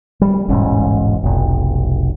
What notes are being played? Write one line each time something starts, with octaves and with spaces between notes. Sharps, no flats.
G3
E1 A1 G#2 C#4
F1 B1